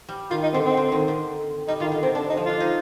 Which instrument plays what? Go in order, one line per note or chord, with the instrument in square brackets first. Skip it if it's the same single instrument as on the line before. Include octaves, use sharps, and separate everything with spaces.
[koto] G3
[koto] D#3 [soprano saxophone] F4
[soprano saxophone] D#4
[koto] D3 [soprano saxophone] C4
[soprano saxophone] C4
[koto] D3
D#3
D3
[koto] G3 [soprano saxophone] D#4
[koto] D#3 [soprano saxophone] F4
[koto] D3
[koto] C3 [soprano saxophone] C4
[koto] D3 [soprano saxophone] D4
[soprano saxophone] D#4
[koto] F3
[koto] D4 [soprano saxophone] F4
[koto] D#4